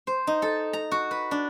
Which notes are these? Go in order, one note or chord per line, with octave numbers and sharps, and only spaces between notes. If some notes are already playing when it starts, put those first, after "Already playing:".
C5
D#4
A4
A#5
F#4
B4
D4